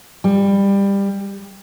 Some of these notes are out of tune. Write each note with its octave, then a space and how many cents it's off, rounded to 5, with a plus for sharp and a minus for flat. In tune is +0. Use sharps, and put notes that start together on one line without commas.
G3 +20